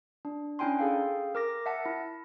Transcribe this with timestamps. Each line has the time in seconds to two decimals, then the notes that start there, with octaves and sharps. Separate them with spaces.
0.25 D4
0.59 C#4 D4 E4 G5 G#5 C6
0.78 G#4 A4 F5 G5
1.35 A#4 D6 A#6
1.66 E5 F#5 A5
1.85 E4